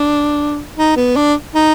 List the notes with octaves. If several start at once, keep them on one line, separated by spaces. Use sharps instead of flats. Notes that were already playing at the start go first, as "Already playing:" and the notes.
Already playing: D4
D#4
B3
D4
D#4